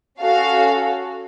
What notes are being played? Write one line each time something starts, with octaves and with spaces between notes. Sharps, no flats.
C#4 F#4 A4 F5